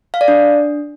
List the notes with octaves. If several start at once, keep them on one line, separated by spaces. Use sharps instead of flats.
F5
D5
D4